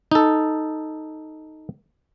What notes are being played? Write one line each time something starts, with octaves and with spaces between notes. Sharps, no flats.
D#4 A4